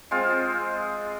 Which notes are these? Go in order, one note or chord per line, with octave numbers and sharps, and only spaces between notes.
G#3 C4 F4